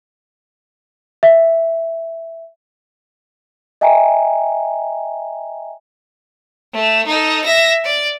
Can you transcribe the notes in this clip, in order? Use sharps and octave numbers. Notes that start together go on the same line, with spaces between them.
E5
D#5 E5 G5 G#5 A#5
A3
D#4 A4
E5 A#6
D5